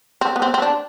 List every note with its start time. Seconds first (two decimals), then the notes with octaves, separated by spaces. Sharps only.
0.21 C4
0.36 B3
0.42 C4
0.54 C4
0.62 D4